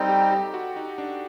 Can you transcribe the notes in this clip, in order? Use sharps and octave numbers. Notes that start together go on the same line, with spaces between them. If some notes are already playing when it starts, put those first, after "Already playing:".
Already playing: G3 C4 D#4 A4
G4
G4
F#4
D#4
D4